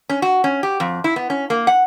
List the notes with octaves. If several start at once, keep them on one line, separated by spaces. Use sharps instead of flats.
C#4
F#4
C#4
G4
F2
E4
B3
C#4
A#3
F#5